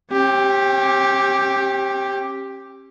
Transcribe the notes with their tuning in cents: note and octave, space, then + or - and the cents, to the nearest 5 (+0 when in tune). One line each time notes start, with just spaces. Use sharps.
C#4 -45 G4 +0